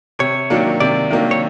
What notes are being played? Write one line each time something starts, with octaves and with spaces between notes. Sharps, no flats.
C3 C#5
D#3 F#3 A#3 D4
C3 D5
D#3 F#3 A#3 D4
C#5